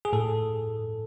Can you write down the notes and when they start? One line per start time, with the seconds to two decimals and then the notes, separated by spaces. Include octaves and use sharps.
0.05 G#4
0.13 A2 A4